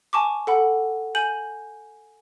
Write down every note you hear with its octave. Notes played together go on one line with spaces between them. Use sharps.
G#5 A5 C#6 D6
A4 F#5 B5
G#5 G6 F#7